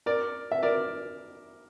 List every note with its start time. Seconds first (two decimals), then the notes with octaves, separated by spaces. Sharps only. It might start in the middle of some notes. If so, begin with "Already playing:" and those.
0.06 A#4 D5
0.51 E5
0.63 A#4 D5